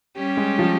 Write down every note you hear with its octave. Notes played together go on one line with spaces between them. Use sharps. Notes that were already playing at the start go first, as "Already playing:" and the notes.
G3 C#4 G4
G#3
F3